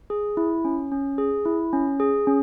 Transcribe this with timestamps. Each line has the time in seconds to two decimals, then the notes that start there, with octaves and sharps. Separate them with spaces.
0.10 G#4
0.37 E4
0.65 C#4
0.92 C#4
1.18 G#4
1.45 E4
1.73 C#4
2.00 G#4
2.27 C#4